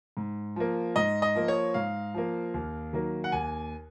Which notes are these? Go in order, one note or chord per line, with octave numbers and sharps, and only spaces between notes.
G#2
F3 A#3
G#2 D#5
D#5
F3 A#3
C#5
G#2 F5
F3 A#3
D#2
D#3 F#3 A#3
F#5
D#2 G#5